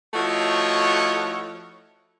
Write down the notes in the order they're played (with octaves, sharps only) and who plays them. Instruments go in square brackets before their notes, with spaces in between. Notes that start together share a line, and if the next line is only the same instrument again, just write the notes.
[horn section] F3 A3 E4 F#4 C#5 D#5